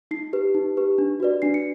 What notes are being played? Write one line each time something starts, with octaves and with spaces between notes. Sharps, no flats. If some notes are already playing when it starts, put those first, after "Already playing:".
D#4 C7
G4 B4
D#4
G4 B4
D4
F#4 B4 D5
D4 C7
C#7